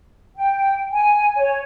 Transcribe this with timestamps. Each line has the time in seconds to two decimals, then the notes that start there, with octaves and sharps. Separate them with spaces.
0.36 G5
0.93 G#5
1.35 C#5